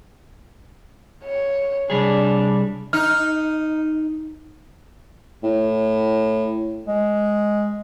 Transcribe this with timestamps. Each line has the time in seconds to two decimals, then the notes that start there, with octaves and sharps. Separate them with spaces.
1.24 C#5
1.90 C2 G3 D4 G#4
2.93 D#4 F6
5.43 A2
6.87 G#3